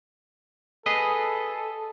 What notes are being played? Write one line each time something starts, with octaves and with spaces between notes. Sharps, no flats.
G#4 A4 B4 D#5